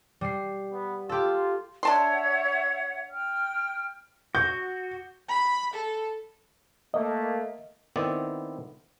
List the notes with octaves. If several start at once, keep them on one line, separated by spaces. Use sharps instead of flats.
G3 C7
B3
F4 G4 A4
D4 C#5 E5 F#5 A5 C6
G5 F6
F#4 G6
B5
A4
A3 A#3 D#5
D#3 B3 C4 E4 D5